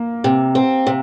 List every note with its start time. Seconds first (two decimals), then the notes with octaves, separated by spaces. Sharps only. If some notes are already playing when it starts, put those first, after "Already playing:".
Already playing: A#3
0.24 C3
0.55 C4
0.87 C3